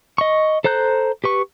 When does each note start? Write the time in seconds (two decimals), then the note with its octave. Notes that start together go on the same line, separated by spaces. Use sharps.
0.18 D#5 C#6
0.64 A4 C5 A#5 F#6 G6
1.24 G4 B4 C#6